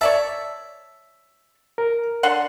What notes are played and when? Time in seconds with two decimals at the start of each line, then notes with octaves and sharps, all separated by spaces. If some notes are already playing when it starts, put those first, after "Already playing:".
0.01 C#5 D5 E5 A5
1.78 A#4
2.23 D3 F#5 C6